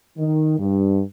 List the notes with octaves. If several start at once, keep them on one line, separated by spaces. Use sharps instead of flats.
D#3
G2